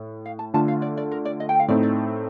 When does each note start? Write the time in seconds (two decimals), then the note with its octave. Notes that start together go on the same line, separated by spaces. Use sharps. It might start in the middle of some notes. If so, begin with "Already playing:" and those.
Already playing: A2
0.26 F5
0.39 A5
0.54 D3 A3 D4 F4 A5
0.68 F5
0.82 D5
0.97 D5
1.11 A#4
1.25 D5
1.40 D#5
1.49 G5
1.59 F5
1.68 A2 A3 C4 D#4 D5
1.83 D5